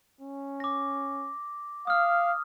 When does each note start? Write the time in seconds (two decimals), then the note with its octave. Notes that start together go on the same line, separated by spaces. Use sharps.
0.21 C#4
0.60 D6 A#6
1.87 F5 D#6 F6